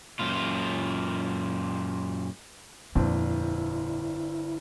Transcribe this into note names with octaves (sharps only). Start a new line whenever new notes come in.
F#2 A#2 F4
G1 F2 A#2 C4 D4 E4